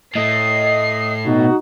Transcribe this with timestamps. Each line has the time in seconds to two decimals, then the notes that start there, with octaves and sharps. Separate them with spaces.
0.15 A2 A3 D#5 C7
1.26 B2 D#4 F#4